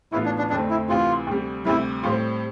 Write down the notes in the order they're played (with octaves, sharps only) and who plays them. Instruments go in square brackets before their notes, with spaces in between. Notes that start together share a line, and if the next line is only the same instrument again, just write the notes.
[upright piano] A2 E3 B3 F4 [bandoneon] E4
[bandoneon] D4
D4
[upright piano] F2 D3 A3 C4 [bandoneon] D4
[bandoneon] E4
[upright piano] D2 C3 E3 [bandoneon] F4
[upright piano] D2 C3 G3
[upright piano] D2 C3 G3 [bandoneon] E4
[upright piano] A2 G3 C4 [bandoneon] F4